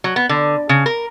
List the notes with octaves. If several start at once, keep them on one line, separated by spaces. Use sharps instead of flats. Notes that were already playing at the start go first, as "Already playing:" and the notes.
F#3
B3
D3
C#3
A#4